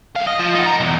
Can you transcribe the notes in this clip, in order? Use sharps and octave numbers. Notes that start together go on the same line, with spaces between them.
C2 F5
D#5
F3
D#4 F#4
A#4
B1 E2